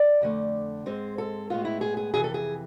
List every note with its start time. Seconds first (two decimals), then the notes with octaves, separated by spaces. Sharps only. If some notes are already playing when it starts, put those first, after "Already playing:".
Already playing: D5
0.22 F2 D3 A3
0.86 G#2 G#3 C4 C5
1.18 A4
1.50 A2 G#3 B3 F4
1.65 E4
1.81 G#4
1.97 G#4
2.13 F2 C3 E3 G#4
2.24 A4
2.34 G#4